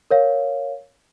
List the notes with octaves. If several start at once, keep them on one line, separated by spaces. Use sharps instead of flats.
A#4 C#5 F5